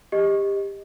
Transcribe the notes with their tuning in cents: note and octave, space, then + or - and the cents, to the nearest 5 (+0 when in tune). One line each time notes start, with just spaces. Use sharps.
G4 +20 D#5 +0